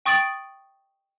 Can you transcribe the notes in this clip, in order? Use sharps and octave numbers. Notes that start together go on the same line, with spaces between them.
G5 C#6 D#6 A6 D7 F#7